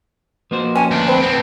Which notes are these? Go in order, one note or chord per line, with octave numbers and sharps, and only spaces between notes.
B2 F3 A#3 C5
C#4 G#5 A5
D2 D4
C4 B4
A2 B3 C4